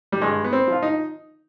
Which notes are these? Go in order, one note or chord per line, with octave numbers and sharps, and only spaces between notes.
G3
G2 G#3
B3
C4
F3 F4
D#4